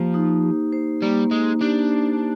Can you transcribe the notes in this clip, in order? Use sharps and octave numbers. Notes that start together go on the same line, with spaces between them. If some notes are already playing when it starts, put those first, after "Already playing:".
Already playing: F3 A#3 G4 C5
D#4
G4
C5
G3 A#3
G#3 D#4
D4 G4
C5